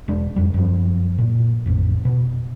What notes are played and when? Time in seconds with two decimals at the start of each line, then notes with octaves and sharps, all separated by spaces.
0.08 E1 G#3 D4
0.36 F2 G3
0.54 F#2 F3
1.18 A#2
1.66 A1 F2
2.05 B2